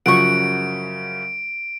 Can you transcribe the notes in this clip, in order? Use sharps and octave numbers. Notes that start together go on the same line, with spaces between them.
F#2 C#3 F3 F#5 C#6 D7